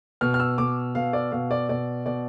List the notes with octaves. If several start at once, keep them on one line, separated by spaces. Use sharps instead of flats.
B2 F6
F6
E6
B2 D6
B2 F5
D5
B2 F5
D5
B2 D5
B2 D5